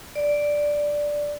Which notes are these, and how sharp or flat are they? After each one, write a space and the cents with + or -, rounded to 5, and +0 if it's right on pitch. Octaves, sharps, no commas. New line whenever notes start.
D5 +0